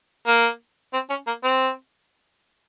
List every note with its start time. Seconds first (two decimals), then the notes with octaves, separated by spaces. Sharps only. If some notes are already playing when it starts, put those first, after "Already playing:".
0.27 A#3
0.94 C4
1.10 C#4
1.27 A#3
1.44 C4